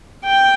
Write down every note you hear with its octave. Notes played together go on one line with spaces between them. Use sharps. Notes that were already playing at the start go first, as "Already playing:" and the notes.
G5